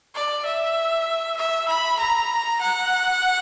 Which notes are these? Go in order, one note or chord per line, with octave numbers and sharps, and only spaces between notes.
D5
E5
E5
B5
A#5
F#5